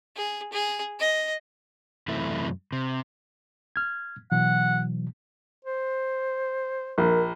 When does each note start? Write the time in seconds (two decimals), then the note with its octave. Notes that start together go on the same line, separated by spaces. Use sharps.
0.16 G#4
0.52 G#4
0.99 D#5
2.08 F#2 C3 E3 A3 E4
2.72 C3
3.76 F6 G#6
4.32 B2 E3 F#3 F#5
5.65 C5
6.98 A#1 A#4